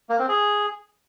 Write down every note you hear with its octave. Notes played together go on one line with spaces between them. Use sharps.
A#3
C4
G#4